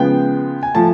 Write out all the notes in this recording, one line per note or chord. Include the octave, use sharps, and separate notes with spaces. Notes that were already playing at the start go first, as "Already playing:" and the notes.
Already playing: C#3 F3 G#3 B3 G5
G#5
F3 A3 A5